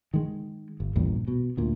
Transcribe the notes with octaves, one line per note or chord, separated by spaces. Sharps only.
D#3 G#3
G1
A#1 E2 G2 A#2
B2
D2 A#2